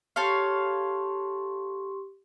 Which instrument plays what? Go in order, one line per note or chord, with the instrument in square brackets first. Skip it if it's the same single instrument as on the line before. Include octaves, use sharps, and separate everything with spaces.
[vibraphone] G4 C6 C#6 [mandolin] A4 C#5 F5